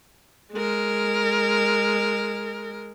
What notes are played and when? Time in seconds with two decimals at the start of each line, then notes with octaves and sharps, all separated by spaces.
0.53 G#3 A#4